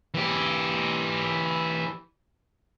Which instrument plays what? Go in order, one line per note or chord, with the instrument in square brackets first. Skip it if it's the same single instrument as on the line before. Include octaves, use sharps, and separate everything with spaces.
[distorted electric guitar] E3 G4